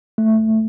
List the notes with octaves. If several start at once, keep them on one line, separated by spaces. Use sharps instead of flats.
A3